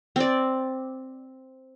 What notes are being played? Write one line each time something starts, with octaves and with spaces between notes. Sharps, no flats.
C4 D5